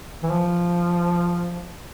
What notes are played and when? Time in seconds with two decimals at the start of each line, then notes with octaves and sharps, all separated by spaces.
0.23 E3
0.31 F3